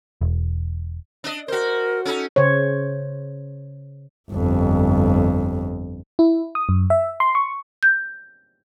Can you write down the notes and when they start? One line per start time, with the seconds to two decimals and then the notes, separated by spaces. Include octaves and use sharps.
0.21 E1
1.24 D4 D#5
1.48 F#4 A#4 C5
2.05 C#4 D#4 A4
2.36 C#3 C5 C#5
4.31 G1 F2
6.19 E4
6.55 D#6
6.69 F#2
6.90 E5
7.20 C6
7.35 C#6
7.83 G6